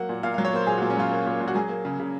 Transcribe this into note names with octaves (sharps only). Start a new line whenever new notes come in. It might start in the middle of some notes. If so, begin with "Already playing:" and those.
Already playing: F#3 A#3 F#5
A#2
A#2 F5
F5
F#3
C#5
A#3 C5
A#2 G#4
F#4
A#2
C#4
F#3 F4
A#3
A#2
A#2
F#4
F#3 G#4
A#3
C#3
C#3